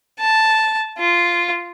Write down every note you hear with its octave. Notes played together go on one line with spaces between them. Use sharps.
A5
F4